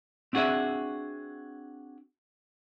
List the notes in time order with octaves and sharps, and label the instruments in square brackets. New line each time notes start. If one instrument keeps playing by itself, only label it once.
[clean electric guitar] C4 D4 F#4 G#4 D5 E5